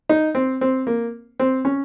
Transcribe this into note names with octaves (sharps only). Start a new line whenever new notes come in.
D#4
C4
C4
A#3
C4
C#4